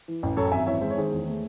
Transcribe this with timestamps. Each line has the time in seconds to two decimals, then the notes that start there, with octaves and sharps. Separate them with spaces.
0.08 E3
0.23 A1
0.37 F#2 A4 C#5
0.52 G#1 E5 G#5
0.66 E3 C#5 E5
0.81 G#3 C5
0.91 C#5
0.97 D#3 G#4 C5
1.11 E2
1.27 A3